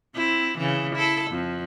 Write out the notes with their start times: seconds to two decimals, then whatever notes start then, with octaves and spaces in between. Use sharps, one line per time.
0.15 C4 E4
0.58 C#3 E3
0.95 E4 A4
1.30 F2